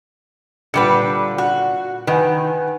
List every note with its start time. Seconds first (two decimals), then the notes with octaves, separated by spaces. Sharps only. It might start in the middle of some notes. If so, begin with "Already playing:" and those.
0.74 A#2 D3 G3 B4 F#5 C#7
1.38 F#4
2.07 D#3 B4 F#5 G#5